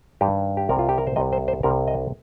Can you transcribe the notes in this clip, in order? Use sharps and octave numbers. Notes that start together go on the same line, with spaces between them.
G2 D#3 G3 G4
G4
C2 C3 G3 A#4
F4
G4
A#4
C5
C2 C3 G3 D#5
C5
C5
C2 C3 G3 A#4
D#5